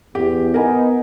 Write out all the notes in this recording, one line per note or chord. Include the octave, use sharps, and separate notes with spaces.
E2 G4
B3 D#4 A#4 G#5